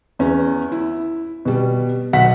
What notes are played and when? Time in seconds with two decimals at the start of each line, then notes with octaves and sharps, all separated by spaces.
0.19 E2 C#4
0.72 E4
1.45 B2 G3
2.13 B1 F#5 B6